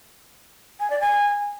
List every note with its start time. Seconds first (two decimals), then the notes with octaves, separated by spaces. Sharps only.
0.80 G#5
0.90 D5
1.00 G#5